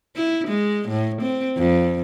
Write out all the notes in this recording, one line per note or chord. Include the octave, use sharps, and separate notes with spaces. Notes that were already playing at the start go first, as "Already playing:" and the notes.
E4
G#3
A2
C4
F2